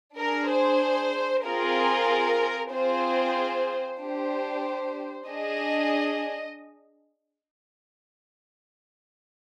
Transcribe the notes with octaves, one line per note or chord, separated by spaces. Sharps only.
D4 G#4 A#4
C5
C4 F4 G#4 A#4
C4 F4 G#4 C5
D4 G4 C5
D4 G#4 D#5